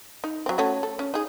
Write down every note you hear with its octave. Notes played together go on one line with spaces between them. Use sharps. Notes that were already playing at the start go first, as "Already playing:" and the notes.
D#4
F#3 C4
A3 C#4 F#4
A4
C#4
D#4 G#4